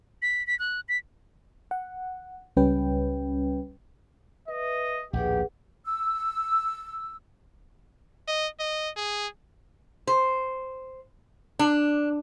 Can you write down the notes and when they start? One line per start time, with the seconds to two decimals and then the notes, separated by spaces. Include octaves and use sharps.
0.22 B6
0.47 B6
0.59 F#6
0.89 B6
1.71 F#5
2.57 C#2 G3 C#4 B4 G5
4.48 B4 D#5 E5
5.13 A#1 D#2 A2 G4 G#4 B4 F#5
5.86 E6
8.28 D#5
8.59 D#5
8.97 G#4
10.07 C5
11.59 D4